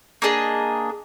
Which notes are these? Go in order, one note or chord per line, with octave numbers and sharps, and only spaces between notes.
A#3 D4 G#4 D#5